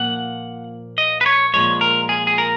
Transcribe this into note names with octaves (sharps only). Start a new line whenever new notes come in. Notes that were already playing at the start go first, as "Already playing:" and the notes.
Already playing: A#2 F3 A#3 F#5
D#5
B4
C#5
A#2 F3 G#3 C#5
A#4
G#4
G#4
A#4